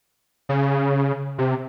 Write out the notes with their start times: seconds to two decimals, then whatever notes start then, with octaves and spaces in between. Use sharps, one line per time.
0.49 C#3
1.38 C3